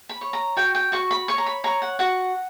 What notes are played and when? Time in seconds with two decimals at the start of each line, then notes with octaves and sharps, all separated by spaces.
0.09 B5
0.21 C#5
0.33 A#5
0.57 F#4 G5
0.75 G5
0.92 F#4 C#6
1.11 B5
1.28 C#5 C#6
1.38 A#5
1.46 B5
1.64 C#5 A#5
1.82 F#5
1.99 F#4 F#5